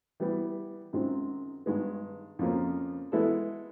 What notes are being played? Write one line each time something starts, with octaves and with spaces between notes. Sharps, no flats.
E3 G3 B3
F#2 D#3 G#3 C4 F4
G2 D#3 G#3 B3
F2 C#3 F3 A#3 C#4
E3 G#3 B3 E4 A4